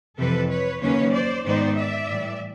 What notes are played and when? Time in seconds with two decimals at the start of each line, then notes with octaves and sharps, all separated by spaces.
0.17 F2 C3 E3 A4 B4
0.49 B4 C#5
0.81 D#2 C#3 F#3 A#3 C#4 B4 C#5
1.12 C5 D5
1.45 G#2 D#3 G#3 B3 D#4 C5 D5
1.75 D5 E5
2.08 A2 E3 G3